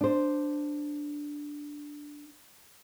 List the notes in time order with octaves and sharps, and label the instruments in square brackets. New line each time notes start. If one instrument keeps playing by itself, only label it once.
[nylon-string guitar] D4 C5